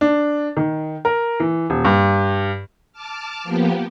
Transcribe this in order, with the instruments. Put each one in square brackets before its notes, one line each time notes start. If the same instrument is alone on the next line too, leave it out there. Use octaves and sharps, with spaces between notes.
[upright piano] D4
D#3
A#4
E3
D#1
G2
[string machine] A5 D6 F6
F3 A#3 B3 G4